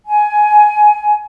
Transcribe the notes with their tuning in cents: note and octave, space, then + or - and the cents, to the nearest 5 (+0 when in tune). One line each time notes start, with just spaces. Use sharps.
G#5 +15